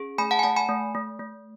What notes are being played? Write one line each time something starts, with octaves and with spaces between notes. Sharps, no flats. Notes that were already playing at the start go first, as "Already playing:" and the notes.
Already playing: C#4 G#4
A3 G#5 B5
F#5 A5
G#5
A3 F#5 A5
G#5 B5
A3
A3
A3